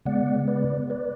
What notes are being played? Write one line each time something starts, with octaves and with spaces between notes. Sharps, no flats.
C#3 G#3 B3 D5 F#5
B4 D5
B4 D5